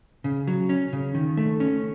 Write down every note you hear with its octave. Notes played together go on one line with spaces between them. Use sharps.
C#3
F#3
C#4
C#3
D#3
A3
C#4